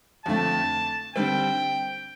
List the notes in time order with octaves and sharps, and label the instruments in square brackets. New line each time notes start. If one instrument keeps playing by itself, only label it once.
[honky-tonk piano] F2 D3 A3 [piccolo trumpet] A5
[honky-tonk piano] D3 G3 C4 [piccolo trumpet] G5